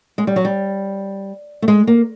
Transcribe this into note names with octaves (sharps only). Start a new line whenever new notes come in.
G#3
G3
F#3
G3
A3
G#3
A#3